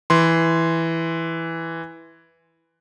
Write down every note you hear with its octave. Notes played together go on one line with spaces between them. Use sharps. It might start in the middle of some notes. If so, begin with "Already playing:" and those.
E3 C6